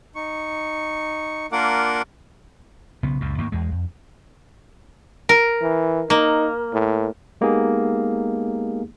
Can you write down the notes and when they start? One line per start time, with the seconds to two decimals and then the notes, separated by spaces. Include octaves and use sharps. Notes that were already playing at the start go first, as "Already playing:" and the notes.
0.15 D#4 C#6
1.52 A#3 D4 F4 A#4 F#5 D6
3.03 B1 C#3 B3
3.20 C#2 F#2 A#2
3.38 D#2 G#2 C#3 A#3
3.52 E2 G#3
3.72 F2
5.29 A#4
5.62 E3
6.10 A#3 D#4
6.74 A2
7.41 G#3 A#3 B3 D#4 G4 G#4